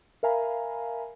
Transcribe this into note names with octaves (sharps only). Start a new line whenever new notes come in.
A#4 E5 F5 G#5 A#5 B5